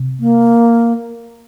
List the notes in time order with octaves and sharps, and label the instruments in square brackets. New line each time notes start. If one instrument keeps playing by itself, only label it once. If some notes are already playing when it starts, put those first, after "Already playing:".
Already playing: [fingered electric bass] C3
[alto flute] A#3